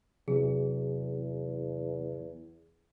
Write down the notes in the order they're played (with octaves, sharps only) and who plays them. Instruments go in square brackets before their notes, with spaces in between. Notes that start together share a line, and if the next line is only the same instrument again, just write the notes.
[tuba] E2 [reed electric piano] C3 F#3 [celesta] G#4